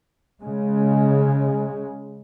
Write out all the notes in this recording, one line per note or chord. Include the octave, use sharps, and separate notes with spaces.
C#3 G#3